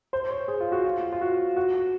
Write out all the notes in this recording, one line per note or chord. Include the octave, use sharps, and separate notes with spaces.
C5
C#5
G#4
F4
F#4
F4
F4
F#4
F#4